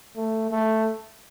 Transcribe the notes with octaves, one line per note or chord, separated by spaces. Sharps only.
A3
A3